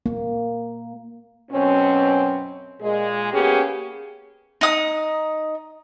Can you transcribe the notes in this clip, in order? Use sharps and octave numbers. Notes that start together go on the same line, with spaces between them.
A#3
F#2 B2 C4 C#4
A#2 G#3 G#4
A#3 B3 C#4 G4 G#4
D#4 D#6